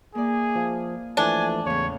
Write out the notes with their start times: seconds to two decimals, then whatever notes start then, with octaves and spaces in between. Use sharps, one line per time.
0.15 A#3 E4 G#4 D5
0.55 F3 F4
1.17 E3 F3 A3 D4 G#5
1.66 E2 A2 C#3 C#5